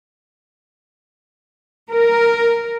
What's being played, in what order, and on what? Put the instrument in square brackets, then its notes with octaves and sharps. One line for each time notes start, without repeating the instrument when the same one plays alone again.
[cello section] A#4